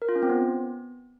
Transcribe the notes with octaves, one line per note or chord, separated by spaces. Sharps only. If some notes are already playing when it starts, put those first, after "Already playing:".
A#4
F4
C#4
C4
B3